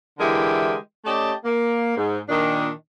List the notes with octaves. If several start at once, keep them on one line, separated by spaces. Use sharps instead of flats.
D3 E3 G#3 E4 G4 A#4
A3 C#4 G4 D5 D#5 A5
A#3
G#2
A#2 D#3 D4